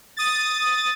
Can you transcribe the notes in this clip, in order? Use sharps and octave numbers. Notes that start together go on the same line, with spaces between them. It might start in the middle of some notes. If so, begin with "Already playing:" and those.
D#6 A6